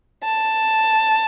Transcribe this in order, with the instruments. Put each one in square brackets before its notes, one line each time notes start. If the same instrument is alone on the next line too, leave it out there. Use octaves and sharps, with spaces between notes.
[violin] A5